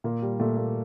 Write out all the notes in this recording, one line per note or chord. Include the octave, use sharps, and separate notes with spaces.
A#2 A#3
G3
A#2 A3
A#3